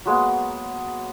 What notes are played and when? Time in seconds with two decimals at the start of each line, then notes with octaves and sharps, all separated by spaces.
0.05 F#3 G#3 A#3 B3